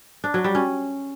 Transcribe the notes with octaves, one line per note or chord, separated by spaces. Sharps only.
D4
F#3
G3
C#4